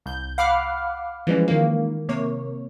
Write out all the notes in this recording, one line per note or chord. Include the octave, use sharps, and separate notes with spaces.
C2 G6
F5 F#5 B5 D6 F6 F#6
E3 F3 G3 G#3 C#4
D#3 A#3
C3 A#3 C#5